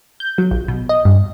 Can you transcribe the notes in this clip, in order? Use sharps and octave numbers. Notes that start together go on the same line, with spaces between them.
G6
F#3
A#1
B2
D#5
G2